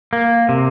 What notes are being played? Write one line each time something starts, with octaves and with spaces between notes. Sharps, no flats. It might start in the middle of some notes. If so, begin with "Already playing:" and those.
A#3
C3